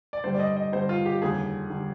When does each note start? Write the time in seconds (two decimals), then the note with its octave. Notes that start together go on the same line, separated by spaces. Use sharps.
0.13 D5
0.24 G2 D3 G3 C5
0.34 D5
0.40 D#5
0.57 D#5
0.72 G2 D3 G3 C5
0.89 F4
1.06 G4
1.22 F1 D#2 D3 G3 G#4
1.70 D3 G3